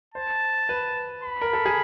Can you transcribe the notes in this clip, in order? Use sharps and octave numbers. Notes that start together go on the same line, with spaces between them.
C5 A5
B4
B5
A#4
A4
G#4